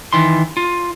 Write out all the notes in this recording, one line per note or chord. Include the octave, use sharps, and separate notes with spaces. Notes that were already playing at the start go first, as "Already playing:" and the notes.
D#3 E3 C6
F4